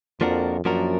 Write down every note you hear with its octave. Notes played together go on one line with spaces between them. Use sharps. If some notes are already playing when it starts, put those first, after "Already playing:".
F2 F3 A#3 D4 F#4 A#4
F#2 F3 A#3 D4 F#4 A#4